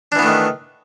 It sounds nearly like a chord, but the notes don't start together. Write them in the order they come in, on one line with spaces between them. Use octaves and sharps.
D4 E3 B3 A3 D#3